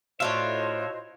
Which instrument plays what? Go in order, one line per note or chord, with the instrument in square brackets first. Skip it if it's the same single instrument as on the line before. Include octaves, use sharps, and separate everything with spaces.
[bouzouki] A2 D4 F4 [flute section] F#4 C5 D#5 [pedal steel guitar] C#5 E5